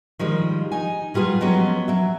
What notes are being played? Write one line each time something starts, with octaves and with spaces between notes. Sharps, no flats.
D#3 F3 G3 G#3
D#4 G#5
F#3 G3 F4 G#4 B4
F3 F#3 G#3 B3 C#4
F#3 E5